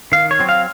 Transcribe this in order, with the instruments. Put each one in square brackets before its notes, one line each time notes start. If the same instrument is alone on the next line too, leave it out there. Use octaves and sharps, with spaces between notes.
[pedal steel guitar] D#3 F5
C#5
F#3 C4
F5